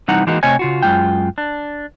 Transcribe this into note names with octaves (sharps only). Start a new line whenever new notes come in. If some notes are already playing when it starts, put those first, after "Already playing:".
C3 E3 G3 D#4 F#5 A#5
E3 G#3 A#3 D#4 F#4
C3 A3 C4 C#5 D#5 G#5
C#3 F4 F#4
F#2 C3 G#3 F4 G5
D4